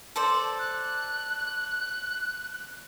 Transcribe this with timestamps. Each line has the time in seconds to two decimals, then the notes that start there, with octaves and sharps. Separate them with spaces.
0.16 A4 C5 D5
0.59 F#6